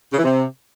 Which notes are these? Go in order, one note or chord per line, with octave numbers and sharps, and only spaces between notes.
C#3
E3
C3